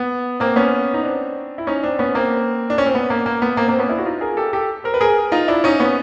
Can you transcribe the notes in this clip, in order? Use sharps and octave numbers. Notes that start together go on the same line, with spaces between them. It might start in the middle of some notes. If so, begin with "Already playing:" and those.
Already playing: B3
A#3 C4
B3 C#4
D#4
C4 D4
E4
C#4 D#4
C4 D4
B3 C#4
A#3 C4
D4
C#4
C4
B3
A#3
A#3
B3
A#3 C4
A#3 C4
B3 C#4
D4 E4
F#4
D#4 F4
G#4 A#4
G4 A4
G4 A4
A#4 C5
B4
G#4 A#4
D#4 F4
D4 E4
C#4 D#4
B3 C#4